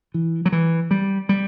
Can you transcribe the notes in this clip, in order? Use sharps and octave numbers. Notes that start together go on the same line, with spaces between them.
E3
F#3
E3
G3
G3